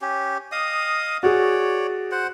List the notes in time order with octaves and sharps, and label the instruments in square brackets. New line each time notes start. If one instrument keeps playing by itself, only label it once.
[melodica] C#4 G4
D#5 F5 D#6
[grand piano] F#4 G#4 [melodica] C#5 D5
[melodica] C5 F#5